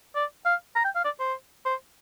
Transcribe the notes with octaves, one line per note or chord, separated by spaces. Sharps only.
D5
F5
A#5
G5
F5
D5
C5
C5